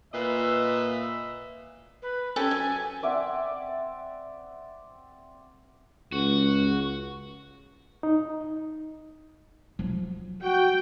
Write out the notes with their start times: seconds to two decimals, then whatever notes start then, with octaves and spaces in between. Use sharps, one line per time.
0.13 A#2 B4 D#5 E5
2.02 B4
2.36 C#4 G4 A4 G#5
2.51 F#3
3.02 C4 D5 E5 F#5
6.12 C#2 F#4
8.03 D#4
9.79 F3 F#3
10.43 F#4 G5